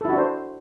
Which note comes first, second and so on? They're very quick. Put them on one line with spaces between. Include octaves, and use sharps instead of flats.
A4 E4 F#4 D4 C5